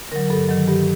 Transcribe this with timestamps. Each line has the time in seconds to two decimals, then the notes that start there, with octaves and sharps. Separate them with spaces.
0.12 D3 F#3 A#4
0.30 G2 A4
0.49 D#3 F#3
0.67 G2 G4